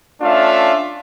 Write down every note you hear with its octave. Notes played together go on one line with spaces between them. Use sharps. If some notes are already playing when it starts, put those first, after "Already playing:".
A3 C#4 D4 F4 E5 F5